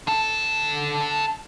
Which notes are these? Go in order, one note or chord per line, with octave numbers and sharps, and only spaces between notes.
D3 A4